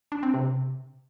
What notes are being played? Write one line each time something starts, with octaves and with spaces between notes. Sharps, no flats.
D4
C4
C3